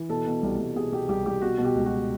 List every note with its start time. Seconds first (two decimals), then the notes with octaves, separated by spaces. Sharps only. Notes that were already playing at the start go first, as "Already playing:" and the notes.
Already playing: E3
0.09 B2 A4
0.26 B2
0.42 C2
0.59 C2
0.76 B2 G#4
0.92 B2 G4
1.09 C2 G4
1.26 C2 G4
1.42 B2 F#4
1.58 B2
1.65 G4
1.75 C#2
1.86 F#4